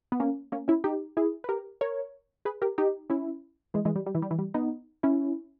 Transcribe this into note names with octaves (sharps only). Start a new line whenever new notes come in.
B3
A#3 C#4
A#3 C#4
C#4 E4
D#4 G4
E4 G#4
B4
G4 A#4
A#4 C#5
G#4 B4
G4 A#4
D#4 G4
C#4 E4
E3 G#3
E3 G#3
G3
G3
E3
G3
E3
G3
B3 D#4
C#4 E4